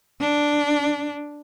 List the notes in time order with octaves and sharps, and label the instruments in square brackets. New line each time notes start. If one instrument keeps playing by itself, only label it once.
[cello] D4